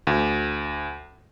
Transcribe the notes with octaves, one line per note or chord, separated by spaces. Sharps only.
D2